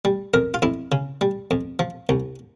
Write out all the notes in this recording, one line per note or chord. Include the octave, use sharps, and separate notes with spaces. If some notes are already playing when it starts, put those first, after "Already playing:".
G3
F2 A#4
F4
F2 E4
C#3
G3
F2
F3
C2